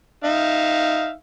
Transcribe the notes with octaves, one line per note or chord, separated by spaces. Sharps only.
D#4 E5 F5